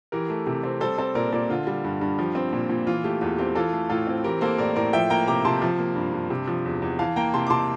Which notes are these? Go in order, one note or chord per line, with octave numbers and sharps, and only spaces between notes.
E3 G4 A#4
A3
C3
C4
G3 A4 C5
C4 A4 C5
A#2 A#4 D5
A#2 A#4 D5
D3 F4
G3
G2
G2
F3 G4
C4
A#2
A#2
E3 F4
A3 G4
E2 F4
C4 G4
E3 F4 A4
A3
A2 F4 A4
C4
E3 G4 A#4
A#3 A4 C5
A2 A#4 D5
A2 A#4 D5
F3 E5 G5
A#3 G5 A#5
C3 A#5 D6
C3 A5 C6
F3
A#3
G2
G2
C3
F3
E2
E2
E3 F5 A5
A#3 G5 A#5
C3 A5 C6
D6
C3 A5 C6